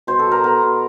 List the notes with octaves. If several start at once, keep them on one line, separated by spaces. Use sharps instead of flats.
B2 C5
A4
F#3
A#4
B3 A#4
B2